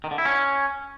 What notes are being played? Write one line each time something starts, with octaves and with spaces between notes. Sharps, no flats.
D#3
D3
E4
C#4